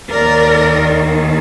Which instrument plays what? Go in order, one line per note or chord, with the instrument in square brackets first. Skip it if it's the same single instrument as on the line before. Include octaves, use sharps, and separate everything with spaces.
[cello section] D#2 D#3 A#4 D5